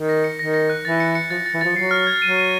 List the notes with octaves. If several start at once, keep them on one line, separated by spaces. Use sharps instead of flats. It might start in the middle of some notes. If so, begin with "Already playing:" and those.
Already playing: D#3
A#6
C#7
D#3 A#6
A#6
F#6
E3 A6
C#7
C#7
F3 A6
A6
E3
F3 A6
F#3 C7
F6
G#6
F#3 D#7
D#7